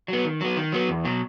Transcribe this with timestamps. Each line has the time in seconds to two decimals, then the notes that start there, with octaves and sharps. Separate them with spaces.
0.08 F#3 B3
0.25 D#3
0.41 F#3 B3
0.57 D#3
0.72 F#3 B3
0.89 E2
1.05 B2 F#3